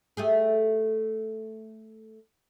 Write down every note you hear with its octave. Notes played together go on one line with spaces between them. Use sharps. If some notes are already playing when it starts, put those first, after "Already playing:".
A3 G4 G#4